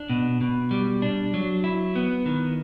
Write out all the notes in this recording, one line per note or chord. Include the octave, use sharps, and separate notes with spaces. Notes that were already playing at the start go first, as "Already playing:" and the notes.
Already playing: D4
B2
B2
G3
D4
F#3
E4
B3
D#3